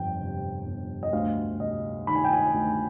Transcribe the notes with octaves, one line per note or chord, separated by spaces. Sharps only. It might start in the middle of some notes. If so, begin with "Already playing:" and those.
Already playing: G1 F2 G5
C3
G1
D#5
D2 F5
C3 D#5
D#3 B5
G#5
G5
G#5
D2